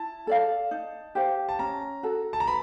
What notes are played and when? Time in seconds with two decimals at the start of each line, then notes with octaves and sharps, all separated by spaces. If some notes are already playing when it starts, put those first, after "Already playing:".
Already playing: E4 A5
0.27 A4 D5 F5
0.71 D#4
1.15 G4 C5 F5
1.49 A5
1.59 C#4 A#5
2.03 F#4 A4
2.33 A5
2.40 A#5
2.48 B4 B5